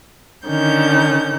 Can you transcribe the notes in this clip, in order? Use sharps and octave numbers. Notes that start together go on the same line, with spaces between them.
D3 D#3 C#4 G6